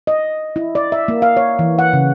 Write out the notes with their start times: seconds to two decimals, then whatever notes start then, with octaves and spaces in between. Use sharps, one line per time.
0.07 D#5
0.56 E4
0.75 D5
0.92 E5
1.08 A#3
1.22 F5
1.37 C#5
1.59 E3
1.79 F#5
1.93 C#3